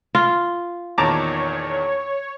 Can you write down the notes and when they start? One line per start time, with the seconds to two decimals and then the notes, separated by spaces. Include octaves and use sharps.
0.15 F4
0.98 E2 A#2 D#3 C#5 A5 A#5 D6